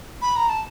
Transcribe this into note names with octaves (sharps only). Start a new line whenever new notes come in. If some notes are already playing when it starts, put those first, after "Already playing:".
B5
A#5
A5